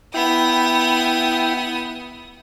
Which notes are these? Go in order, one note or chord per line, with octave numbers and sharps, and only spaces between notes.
B3 E4 G5 D#6